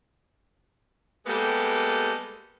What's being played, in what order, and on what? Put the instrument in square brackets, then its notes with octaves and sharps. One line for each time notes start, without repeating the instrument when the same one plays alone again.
[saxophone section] G3 G#3 A#3 B3 G4 A4